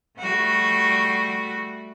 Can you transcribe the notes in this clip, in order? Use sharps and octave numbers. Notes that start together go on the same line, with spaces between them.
G3 A3 F#4